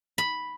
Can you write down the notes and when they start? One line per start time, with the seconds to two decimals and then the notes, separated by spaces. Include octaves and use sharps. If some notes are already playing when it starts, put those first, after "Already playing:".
0.18 B5